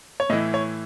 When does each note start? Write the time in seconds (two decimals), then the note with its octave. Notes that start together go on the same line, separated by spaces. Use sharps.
0.20 C#5
0.30 A2 D#5
0.33 E3
0.54 C#5